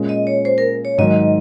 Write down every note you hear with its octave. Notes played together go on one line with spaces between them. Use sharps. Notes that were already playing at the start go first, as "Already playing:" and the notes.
Already playing: A#2 G#3 C#4
D#5
C#5
C5
A#4
C#5
G#2 D#3 F#3 D#5